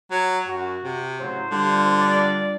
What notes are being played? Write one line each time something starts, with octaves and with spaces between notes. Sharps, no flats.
F#3
F#2 F#4
C3
A2 C#3 F#3 C5
D3 G3 D4 F4
D5